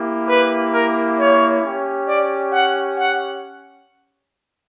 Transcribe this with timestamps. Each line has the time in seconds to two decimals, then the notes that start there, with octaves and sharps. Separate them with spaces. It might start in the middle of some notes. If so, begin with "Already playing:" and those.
Already playing: A#3 E4 G4
0.27 B4
0.72 A#4
1.17 C#5
1.63 C#4 G4
2.06 D5
2.52 F#5
2.97 F#5